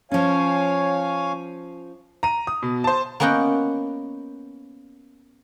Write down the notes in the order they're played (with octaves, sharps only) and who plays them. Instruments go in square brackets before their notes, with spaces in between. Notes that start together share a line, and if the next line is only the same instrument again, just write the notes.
[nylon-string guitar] F3 C#4 [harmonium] C#5 F5 G#5
[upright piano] A#5 D#7
D#6
B2
C5 A5
[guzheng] A#3 B3 C#4 D#5 F#5 G5